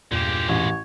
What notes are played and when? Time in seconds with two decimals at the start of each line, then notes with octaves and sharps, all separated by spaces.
0.11 E2 G2 A#2 G#3 A#3 G4
0.49 A1 C#5